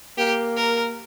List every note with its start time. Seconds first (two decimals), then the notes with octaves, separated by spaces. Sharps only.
0.18 A#3 G4
0.56 A#4